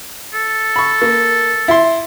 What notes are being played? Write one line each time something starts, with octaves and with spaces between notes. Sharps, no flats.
A4
B5 C#6
A#3
E4 C6